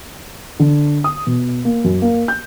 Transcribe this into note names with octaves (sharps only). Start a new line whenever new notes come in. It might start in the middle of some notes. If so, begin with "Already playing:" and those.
D3
D#6
B2
A#3
F#2
A#3
G6